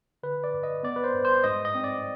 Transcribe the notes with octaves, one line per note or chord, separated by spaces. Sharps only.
D3 B4
D5
G2
D#5
B3 D5
B4
C5
G2
C5
G#2 D#5
D#5
C4
D5